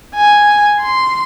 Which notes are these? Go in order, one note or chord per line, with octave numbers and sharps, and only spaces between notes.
G#5
C6